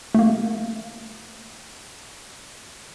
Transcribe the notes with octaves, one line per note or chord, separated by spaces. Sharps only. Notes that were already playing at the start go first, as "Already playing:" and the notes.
A3 A#3